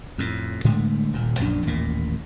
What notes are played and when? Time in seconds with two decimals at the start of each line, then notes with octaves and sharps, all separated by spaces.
0.18 F2 A2
0.64 A2 D3 G#3 A3
1.13 D#1 A#2
1.39 A#1 F#2 A#2 D4
1.67 A1 D#2 A#2 A#3